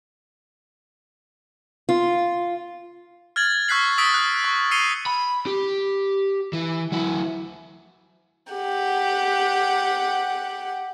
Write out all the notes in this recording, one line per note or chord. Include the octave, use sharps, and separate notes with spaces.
F4
F6 G#6 A6 F#7
C#6 E6 F#6 B6 C7 F#7
D#6 E6 A6 B6 D7
F#6
C#6
E6 C7 C#7 D#7 F7 G7
B5
G4
E3
F#3 E4
G4 F#5